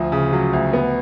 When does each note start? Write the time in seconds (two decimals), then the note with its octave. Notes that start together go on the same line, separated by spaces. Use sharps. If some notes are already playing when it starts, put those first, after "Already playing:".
Already playing: D2 F3
0.12 C#3
0.33 F#3
0.53 D2
0.73 B3